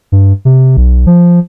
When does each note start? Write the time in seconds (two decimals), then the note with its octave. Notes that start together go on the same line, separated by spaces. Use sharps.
0.12 G2
0.45 C3
0.77 B1
1.06 F3